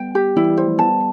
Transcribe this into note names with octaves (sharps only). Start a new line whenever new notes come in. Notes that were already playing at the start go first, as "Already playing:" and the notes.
Already playing: G3 B3 G5
G4
E3 G3 E4
E3 G3
C5
F3 A3
G3 B3 A5